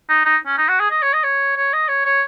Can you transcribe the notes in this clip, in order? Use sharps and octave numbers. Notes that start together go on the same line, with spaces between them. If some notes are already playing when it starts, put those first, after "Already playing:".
D#4
D#4
C#4
D#4
F#4
G#4
D#5
C#5
D#5
C#5
C#5
D#5
C#5
C#5